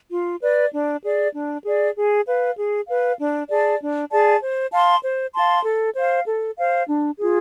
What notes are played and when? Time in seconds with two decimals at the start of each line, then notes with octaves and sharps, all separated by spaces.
0.11 F4
0.41 B4 D5
0.72 D4
1.03 G#4 D5
1.33 D4
1.65 G#4 D5
1.96 G#4
2.26 B4 F5
2.56 G#4
2.87 B4 F5
3.18 D4
3.49 G#4 D5 A5
3.80 D4
4.10 G#4 D5 A5
4.42 C5
4.72 F5 A5 C6
5.03 C5
5.34 F5 A5 C6
5.65 A4
5.95 C5 F5
6.26 A4
6.58 C5 F5
6.87 D4
7.19 F4 G#4